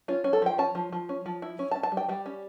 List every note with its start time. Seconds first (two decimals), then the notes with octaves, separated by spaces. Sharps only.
0.08 C#4 F4
0.24 C#4
0.33 A4
0.42 F3 G5
0.58 C#4 A5
0.75 F3
0.92 F3
1.09 C#4
1.26 F3
1.42 E4
1.59 C#4
1.71 A5
1.76 C#4
1.83 A5
1.92 G3
1.97 G5
2.09 G3 G5
2.26 C#4